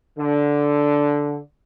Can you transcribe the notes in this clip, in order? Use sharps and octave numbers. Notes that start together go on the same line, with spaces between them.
D3